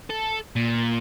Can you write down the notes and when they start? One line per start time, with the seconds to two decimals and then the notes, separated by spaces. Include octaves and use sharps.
0.10 A4
0.56 A#2